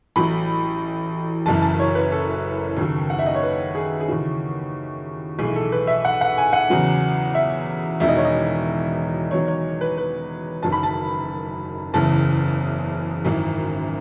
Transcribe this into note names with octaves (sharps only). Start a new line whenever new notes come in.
A1 A2 F#3 B5
F#1 F#2 E3 A5
A5
C#5
B4
A4
D#2 C#3 F#3
F#5
E5
D#5
C#5
B4
G#4
G#4
D#2 C#3 E3 F#4
B1 A2 E3 G#4
A4
B4
E5
F#5
F#5
G#5
F#5
E2 C#3 F#3
E5
E1 E2 D#3 F#3 E5
D#5
C#5
D#5
E2 D#3 F#3 C#5
C#5
B4
B4
F#1 F#2 D#3 F#3 A5
B5
A5
F#1 E2 C#3 E3 A5
G#1 F#2 E3